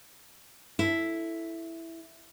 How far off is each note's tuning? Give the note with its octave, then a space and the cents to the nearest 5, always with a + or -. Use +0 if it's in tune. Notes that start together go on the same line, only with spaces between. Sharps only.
E4 +0 A4 +0